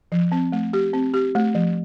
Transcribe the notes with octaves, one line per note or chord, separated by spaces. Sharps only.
F3
C4
A3
G4
C4
G4
A3
F3